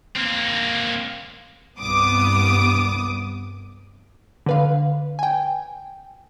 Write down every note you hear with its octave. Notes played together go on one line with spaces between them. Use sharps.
A#3 C4
C2 G2 B3 D6 D#6
D3 B4 F5
G5 G#5